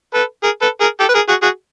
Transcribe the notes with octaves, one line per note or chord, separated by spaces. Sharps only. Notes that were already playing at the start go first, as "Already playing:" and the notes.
A4 B4
G#4 A#4
A4 B4
G#4 A#4
G4 A4
B4
G#4 A#4
F#4 G#4
F#4 G#4